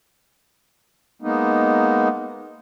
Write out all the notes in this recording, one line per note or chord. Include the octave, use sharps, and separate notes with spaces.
G#3 A#3 B3 D#4